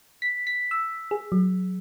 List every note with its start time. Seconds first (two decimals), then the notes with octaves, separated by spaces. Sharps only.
0.22 B6
0.47 B6
0.71 E6
1.11 G#4
1.32 F#3